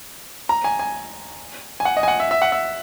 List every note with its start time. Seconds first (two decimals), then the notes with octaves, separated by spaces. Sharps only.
0.49 A#5
0.64 G#5
0.80 G#5
1.80 G#5
1.85 F#5
1.97 D#5
2.03 G#5
2.08 F#5
2.20 E5
2.31 E5
2.42 F#5
2.52 E5